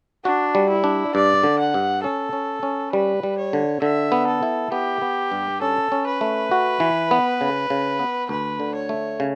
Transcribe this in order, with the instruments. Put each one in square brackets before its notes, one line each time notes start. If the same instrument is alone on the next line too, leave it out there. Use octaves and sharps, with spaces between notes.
[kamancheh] D4 [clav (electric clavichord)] F#4
[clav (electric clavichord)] G3
[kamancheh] E4
[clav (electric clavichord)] D4
[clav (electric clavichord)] G2 [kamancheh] D5
[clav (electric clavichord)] D3
[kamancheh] F#5
[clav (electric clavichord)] G2
[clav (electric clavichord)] C#4 [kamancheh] A4
[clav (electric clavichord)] C#4
C#4
[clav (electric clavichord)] G3 [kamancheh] B4
[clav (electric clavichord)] G3
[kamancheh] C#5
[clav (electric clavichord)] D3
[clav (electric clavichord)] D3 [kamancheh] E5
[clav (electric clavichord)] B3
[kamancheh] A4
[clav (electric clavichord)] E4
[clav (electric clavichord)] B3 [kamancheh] G4
[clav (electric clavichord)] B3
G2
[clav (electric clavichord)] C#4 [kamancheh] A4
[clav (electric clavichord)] C#4
[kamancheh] B4
[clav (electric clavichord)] A3
F#4
E3
B3
C#3
C#3
B3
[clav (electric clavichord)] D2 [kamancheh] B4
[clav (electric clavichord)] D3
[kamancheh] C#5
[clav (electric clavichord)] A3
C#3